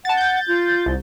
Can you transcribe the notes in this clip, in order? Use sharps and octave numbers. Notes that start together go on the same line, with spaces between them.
F#5 A5 A6
G6 A6
F4
C2